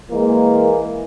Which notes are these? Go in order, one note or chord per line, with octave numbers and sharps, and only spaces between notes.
E3 G#3 A#3